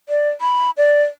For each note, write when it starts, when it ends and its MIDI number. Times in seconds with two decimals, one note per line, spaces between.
0.09 0.30 74
0.41 0.71 83
0.77 1.03 74